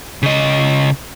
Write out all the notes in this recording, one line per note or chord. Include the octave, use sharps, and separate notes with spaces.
C#3 D#5